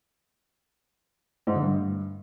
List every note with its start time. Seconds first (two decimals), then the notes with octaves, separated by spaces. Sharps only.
1.47 G#2
1.54 D3
1.62 G2